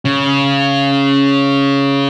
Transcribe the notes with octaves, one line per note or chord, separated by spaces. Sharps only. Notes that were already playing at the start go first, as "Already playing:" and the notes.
C#3